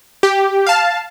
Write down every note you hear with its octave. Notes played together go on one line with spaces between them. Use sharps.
G4
F5 A5